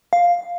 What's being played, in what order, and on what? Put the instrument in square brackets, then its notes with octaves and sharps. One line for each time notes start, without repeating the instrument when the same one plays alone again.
[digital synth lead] F5